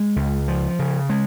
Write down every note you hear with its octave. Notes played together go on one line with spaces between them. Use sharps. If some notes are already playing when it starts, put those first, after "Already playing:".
Already playing: G#3
C#2
F3
C#3
G#3